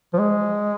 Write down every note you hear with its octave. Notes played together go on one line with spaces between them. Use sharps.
F3
G#3